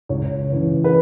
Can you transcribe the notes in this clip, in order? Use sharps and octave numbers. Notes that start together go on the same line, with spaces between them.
C#2 C#5
C#3 E3
B4